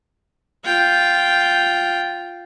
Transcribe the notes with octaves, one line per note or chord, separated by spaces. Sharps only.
F4 G5